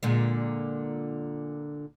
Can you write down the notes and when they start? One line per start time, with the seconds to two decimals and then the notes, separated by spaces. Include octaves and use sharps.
0.03 A#2 D3 G#3